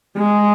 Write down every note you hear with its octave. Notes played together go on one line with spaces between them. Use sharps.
G#3